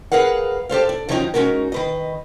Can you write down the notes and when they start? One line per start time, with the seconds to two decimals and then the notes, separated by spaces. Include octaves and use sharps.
0.12 G#4 A#4 B4 F5 F#5
0.69 G4 A4 C5 F5
0.89 D4
1.09 D#3 F3 F#3 C#4 D#4 G4
1.34 G#3 C#4 D#4 F#4 A#4
1.72 D#3 B4 D#5